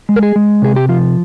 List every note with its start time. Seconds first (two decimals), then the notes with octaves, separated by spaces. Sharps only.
0.09 G#3
0.16 A#4
0.23 G#4
0.36 G#3
0.62 C3 G#4
0.76 G4
0.89 F3 F4